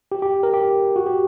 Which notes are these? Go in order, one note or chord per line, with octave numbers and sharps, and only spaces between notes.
G4
G4
A#4
G4
F#4
G4